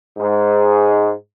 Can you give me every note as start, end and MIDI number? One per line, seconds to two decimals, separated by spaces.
0.18 1.11 44